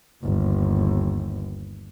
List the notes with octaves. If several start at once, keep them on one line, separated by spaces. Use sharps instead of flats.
G1 D#2